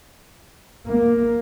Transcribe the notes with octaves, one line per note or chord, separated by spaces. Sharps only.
A#3